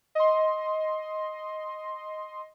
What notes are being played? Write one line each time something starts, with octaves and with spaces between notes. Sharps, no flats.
D#5 C6